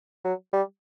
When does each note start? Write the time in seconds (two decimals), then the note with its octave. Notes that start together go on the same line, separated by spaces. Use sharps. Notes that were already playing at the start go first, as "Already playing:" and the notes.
0.24 F#3
0.53 G3